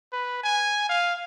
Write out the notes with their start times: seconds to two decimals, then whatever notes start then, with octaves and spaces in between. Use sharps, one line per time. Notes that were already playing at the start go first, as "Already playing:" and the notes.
0.13 B4
0.43 G#5
0.89 F5